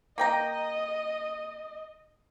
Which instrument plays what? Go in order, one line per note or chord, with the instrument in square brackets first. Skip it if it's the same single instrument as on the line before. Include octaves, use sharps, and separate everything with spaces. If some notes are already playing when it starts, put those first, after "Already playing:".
[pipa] A#3 G5 A#5 [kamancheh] D#5